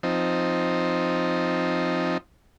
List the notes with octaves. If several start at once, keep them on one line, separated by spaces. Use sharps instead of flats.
F3 C4 D#4